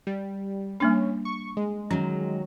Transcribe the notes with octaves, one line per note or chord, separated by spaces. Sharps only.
G3
G3 A#3 C#4 D4
C#6
G#3
D#3 F#3 C#4